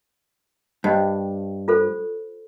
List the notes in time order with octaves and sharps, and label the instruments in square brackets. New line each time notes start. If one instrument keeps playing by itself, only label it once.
[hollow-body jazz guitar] G2 [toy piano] C5 D#5 G5
[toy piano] F4 A4 C5